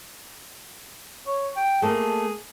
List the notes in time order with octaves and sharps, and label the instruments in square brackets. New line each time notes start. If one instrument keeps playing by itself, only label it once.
[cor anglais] C#5
G5
[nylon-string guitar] A3 A#3 [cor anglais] G#4